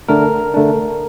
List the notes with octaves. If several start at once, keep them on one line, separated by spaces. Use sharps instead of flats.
D3 A3 D4 A#4
D3 A3 D4